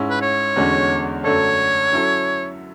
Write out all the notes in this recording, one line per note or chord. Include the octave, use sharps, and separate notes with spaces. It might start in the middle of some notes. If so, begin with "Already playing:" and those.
Already playing: G#2 G#3 C#4 E4
B4
C#5
E2 D3 G#3 C#4 F#4
F#2 D3 A3 D4 A4 C#5
F#3 C#4 E4 A4